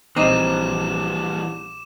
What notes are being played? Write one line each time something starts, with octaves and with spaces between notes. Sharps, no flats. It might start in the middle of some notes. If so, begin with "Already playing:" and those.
A#1 E3 G3 C4 D#4 D6 E7